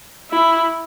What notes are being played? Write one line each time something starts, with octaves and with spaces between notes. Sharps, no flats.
E4